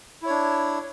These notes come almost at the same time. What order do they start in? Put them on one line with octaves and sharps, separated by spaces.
E4 C#5 D4